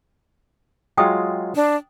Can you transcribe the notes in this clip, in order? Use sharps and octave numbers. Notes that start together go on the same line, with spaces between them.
F#3 G#3 F4 G5 D#6
D4